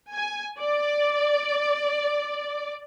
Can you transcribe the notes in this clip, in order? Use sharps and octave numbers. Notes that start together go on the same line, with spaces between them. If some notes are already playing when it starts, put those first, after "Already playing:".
G#5
D5